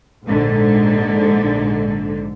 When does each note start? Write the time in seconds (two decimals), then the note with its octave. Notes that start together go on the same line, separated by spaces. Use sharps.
0.25 A#1 G#2 D3